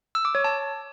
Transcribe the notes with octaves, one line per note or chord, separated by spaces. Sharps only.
E6
D6
C#5
A5